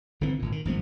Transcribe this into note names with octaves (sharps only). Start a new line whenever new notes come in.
G1 D3 E3 C4
G#1 A#2
D#3
G#1 G2 F3 B3